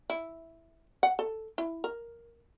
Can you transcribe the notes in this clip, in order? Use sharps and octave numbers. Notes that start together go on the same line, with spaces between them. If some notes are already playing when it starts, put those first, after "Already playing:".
E4
F#5
A4
E4
A#4